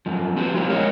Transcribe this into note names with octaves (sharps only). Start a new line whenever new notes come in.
F#2 F3
C4 F#4 G4
F3 C4 E4 F#4 G4 A#4
G#3 A#4 C#5 D#5 F5 F#5